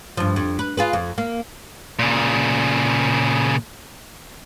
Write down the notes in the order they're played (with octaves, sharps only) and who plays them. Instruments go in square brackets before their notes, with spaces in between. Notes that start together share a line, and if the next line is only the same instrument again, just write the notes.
[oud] G2 F3
F2
B4
F4 G#4 B4
F2
A#3
[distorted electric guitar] A#2 C#3